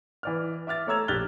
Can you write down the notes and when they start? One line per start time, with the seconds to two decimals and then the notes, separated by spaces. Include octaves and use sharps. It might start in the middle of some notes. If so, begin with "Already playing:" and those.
0.23 E3 D5 F6
0.67 E5 D6 F6 A6
0.87 A3 C#5 A#5 E6 G#6 F7
1.08 A#1 G4 F6 F#6 A6 G7